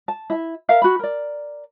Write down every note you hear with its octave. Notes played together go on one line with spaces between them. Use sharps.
A5
E4 E5
A#4 E5 F5
F#4 B5
A#4 D5